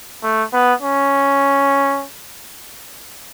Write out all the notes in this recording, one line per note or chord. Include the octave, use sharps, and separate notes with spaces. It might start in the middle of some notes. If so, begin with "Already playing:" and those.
A3
B3
C#4